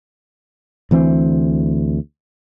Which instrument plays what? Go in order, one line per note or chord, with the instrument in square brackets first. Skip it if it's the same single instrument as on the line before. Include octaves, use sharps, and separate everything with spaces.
[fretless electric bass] D2 E3 C4